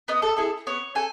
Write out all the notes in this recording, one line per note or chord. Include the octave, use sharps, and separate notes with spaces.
B3 D#5
A4
E4 G#4 A4
B3 C#5
A4 G#5